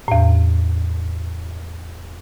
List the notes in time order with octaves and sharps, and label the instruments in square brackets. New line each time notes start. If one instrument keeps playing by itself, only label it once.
[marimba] E2 A2